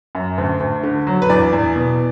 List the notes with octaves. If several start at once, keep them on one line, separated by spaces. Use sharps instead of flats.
F#2
D2
D2
D3
F#3
B4
E2 D5
E2
B2